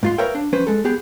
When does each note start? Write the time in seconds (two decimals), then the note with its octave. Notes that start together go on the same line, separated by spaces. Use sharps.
0.03 G#2 F4 C6
0.18 A#4 B4 C#5 E5 F5 G5
0.35 D4
0.53 F3 C#4 B4 C5
0.67 G#3 A4
0.84 B3 G4 G#4